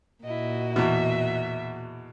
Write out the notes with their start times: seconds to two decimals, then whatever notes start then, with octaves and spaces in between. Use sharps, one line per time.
0.24 A#2 E4 F#4 D#5
0.76 E2 B2 E5